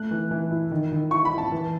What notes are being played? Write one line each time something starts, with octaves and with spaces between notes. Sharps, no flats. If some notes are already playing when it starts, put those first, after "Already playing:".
Already playing: A3 F#6
E3
E3
E4
D#3
D#3
E4 C#6
B5
E4
A5
E3